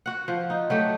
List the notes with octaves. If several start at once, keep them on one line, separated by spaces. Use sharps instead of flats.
F#4 F#5
F3
D#4
F#3 A3 G4